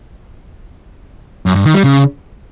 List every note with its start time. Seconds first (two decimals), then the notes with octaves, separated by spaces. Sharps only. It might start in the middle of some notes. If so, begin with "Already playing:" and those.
1.46 F#2
1.55 G2
1.65 D#3
1.74 G3
1.84 C#3